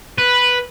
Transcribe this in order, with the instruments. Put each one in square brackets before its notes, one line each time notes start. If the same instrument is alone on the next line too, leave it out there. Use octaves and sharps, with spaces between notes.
[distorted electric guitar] B4